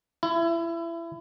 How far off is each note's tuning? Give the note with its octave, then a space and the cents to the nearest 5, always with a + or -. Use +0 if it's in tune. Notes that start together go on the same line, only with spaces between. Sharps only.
E4 +25